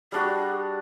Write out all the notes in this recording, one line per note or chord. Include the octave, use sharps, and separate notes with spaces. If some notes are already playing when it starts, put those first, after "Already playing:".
G3 D4 F#4 G#4